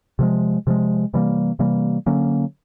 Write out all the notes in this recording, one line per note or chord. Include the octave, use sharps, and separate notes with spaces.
C3 F3 G#3
C3 F3 G#3
C3 E3 G3 A#3
C3 E3 G3 A#3
D3 F#3 A#3 C#4